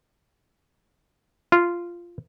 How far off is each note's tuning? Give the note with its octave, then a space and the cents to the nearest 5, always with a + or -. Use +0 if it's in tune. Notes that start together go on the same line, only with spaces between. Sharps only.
F4 -10